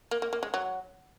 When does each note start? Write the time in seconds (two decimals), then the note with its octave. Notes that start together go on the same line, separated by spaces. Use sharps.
0.11 A#3
0.22 A#3
0.33 A#3
0.43 G#3
0.54 F#3